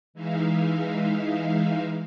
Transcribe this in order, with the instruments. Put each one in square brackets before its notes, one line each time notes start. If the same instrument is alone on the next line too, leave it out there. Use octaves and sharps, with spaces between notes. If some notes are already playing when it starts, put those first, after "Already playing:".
[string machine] E3 G#3 D#4 E5 F5